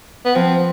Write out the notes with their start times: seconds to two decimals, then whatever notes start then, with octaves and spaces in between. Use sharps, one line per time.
0.25 B3
0.35 F3 C4